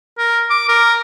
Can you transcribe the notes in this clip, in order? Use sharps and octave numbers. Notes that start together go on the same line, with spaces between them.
A#4
D6
A#4